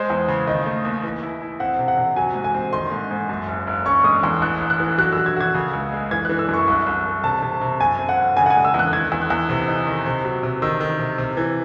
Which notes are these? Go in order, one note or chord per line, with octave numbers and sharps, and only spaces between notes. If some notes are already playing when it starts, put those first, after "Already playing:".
Already playing: G#3 C5
E2
C#3
D#3 D#5
A3
D#2
E3
E4
E4
C4 F#5
C3
F#5
C3
F#3 G#5
G#2
G#5
C4
D#3 C6
G#2
G#2
F#2
F#1
F#1
C#4 C#6
G#3 D#6
E2 C6
A1 F#6
A1
F#6
E3
F#3 F#6
F#3 E6
G#6
F#4 G#6
C#3
C#2
G#3
E3 G#6
E3 F#6
E6
F#2 C#6
C2
C2
C2
C3 A5
C3
C3
F#2 G#5
C4
F#5
F#1
C#3 G#5
F#5
G#5
G#3
E6
E2
F#6
D#3 G#6
E2
F#6
E2
C3
D#4
D#3
C3
F#3
C3
D#3 E6
D#3
C3
C3
E3